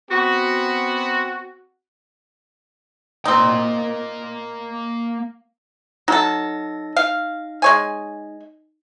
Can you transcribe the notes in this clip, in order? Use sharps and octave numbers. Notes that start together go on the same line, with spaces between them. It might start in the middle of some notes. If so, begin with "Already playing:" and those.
B3 C4 F#4
A#3 C4 D#4 C6
F#3 D#4 A4 A#6
F5
G#3 C#5 G#5